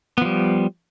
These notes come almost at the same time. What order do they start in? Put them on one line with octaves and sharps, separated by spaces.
B3 F3 G3